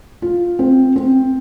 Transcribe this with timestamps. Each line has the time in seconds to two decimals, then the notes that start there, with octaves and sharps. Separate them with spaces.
0.22 F4
0.59 C4
0.96 C4